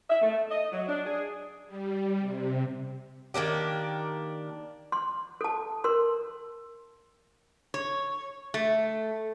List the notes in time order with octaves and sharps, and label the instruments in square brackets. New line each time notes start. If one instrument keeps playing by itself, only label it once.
[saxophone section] E5
A3
D#5
F#3
D4
G#4
[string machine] G3
C3
[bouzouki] D#3 A#3 D4 G4
[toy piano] C6
A4 A5
A#4 C6
[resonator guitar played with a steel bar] C#5
A3